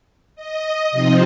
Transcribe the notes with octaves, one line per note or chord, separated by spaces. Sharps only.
D#5
C3 F3 C4 D#4